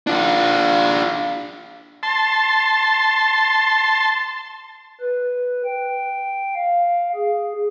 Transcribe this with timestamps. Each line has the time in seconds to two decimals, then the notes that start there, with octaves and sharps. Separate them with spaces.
0.07 D4 F4
2.03 A5 C6
5.01 B4
5.65 G5
6.55 F5
7.15 G#4